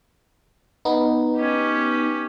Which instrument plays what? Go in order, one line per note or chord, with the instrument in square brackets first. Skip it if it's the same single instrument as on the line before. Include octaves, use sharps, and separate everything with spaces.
[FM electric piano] B3 D#4
[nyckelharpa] C#4 G4